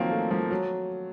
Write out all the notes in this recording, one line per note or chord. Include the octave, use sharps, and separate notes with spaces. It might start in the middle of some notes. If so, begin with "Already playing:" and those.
Already playing: D#3 F3 F#3 A#3 C4
A3
F3
F#3